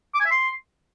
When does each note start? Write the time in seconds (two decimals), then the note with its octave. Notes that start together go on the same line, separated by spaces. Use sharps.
0.14 D6
0.20 G#5
0.26 E5
0.31 C6